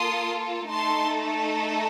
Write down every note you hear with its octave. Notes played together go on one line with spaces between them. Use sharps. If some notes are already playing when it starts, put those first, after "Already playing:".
Already playing: A#3 F4 A4 C6 D#6
A3 D#4 A4 A5 C6